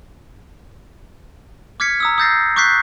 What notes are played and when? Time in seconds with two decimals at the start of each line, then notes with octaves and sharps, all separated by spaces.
1.80 D6 F6 G#6 B6 C#7
2.00 A#5 D#6 E6
2.18 D#6 E6 G6 A6 A#6 C7
2.56 C#6 D6 F#6 G6 B6 C7